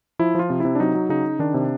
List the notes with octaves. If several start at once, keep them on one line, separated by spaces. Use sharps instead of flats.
F3 E4
F3 F4
C3
C3 E4
D4
F#3 D#4
F#3
C#3 D#4
C#3
D#3 D4
C3